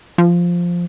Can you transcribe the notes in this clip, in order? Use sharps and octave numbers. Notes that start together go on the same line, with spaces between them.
F3